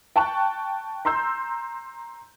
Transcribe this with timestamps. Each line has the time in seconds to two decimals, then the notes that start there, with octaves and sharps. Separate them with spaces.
0.16 G5 A5 C#6 F#6
1.05 A#5 C6 E6 G6